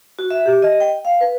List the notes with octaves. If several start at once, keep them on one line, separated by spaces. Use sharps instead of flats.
F#4
E5
G4
D#5
G5
F5
B4